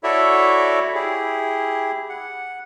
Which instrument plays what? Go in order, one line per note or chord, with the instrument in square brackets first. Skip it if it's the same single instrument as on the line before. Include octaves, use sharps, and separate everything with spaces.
[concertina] E4 F#4 A4 C#5 D5 E5
E4 G4 G#4
F#5